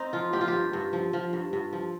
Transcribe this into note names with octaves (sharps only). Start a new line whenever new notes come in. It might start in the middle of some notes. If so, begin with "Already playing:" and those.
Already playing: C4 D#4
F3 F4
F3 G4
F4
G2 G4
G2
F3
F3
G2
G2
F3